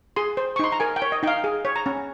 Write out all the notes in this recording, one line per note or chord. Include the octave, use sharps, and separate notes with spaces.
G#4 C6
C5
C#6
D#4 C6
A#5
A#4 G#5
G5
C#5
D#5
D#4 F5 G5
G#4
C#5
A#5
C#4